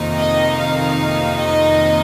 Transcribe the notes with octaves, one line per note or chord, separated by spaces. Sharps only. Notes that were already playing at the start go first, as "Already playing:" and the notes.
Already playing: F2 C3 D#3 A#3 D#4
D#5
F5
D#5